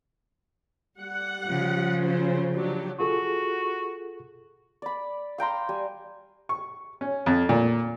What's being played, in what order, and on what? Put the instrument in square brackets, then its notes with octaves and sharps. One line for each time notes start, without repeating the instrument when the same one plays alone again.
[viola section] G3 F#5
[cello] C#3 F3
[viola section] F#3 C#4 C5
F#3 D4 G4
[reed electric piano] F4 G#4 A4 [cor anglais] F#4
[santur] D5 B5
F5 G5 A#5 C6
G3 G#5
[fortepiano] C#6
C#4
F2
A#2